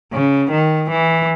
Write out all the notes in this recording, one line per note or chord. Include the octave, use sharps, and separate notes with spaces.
C#3
D#3
E3